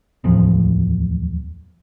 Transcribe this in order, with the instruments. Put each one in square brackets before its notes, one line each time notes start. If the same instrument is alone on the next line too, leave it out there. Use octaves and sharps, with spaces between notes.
[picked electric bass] D1 E2 A2 F3